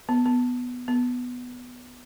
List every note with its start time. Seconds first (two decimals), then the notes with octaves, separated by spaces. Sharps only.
0.09 B3
0.26 B3
0.88 B3